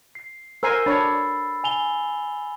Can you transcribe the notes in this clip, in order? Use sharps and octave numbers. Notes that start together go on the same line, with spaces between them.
C7
A#4 C5 G#5 E6 C7
D4 C#5 B5 A6
G#5 F7 G7